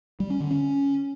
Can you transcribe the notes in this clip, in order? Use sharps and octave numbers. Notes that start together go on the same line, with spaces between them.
G3
C#4
D3
C#4